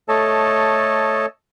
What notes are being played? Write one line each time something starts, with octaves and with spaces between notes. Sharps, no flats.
A3 A4 C#5 D#5 A5